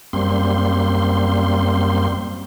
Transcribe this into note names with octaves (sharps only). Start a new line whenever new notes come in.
F#2 G3 A#3 C4 C6